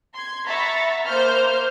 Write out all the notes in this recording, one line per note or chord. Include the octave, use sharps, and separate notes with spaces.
C6 G#6
E5 F#5 A#5 B5 C#6 A6
A#3 C5 F5 F6 G6